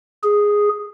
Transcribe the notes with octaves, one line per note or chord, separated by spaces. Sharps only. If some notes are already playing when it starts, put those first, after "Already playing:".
G#4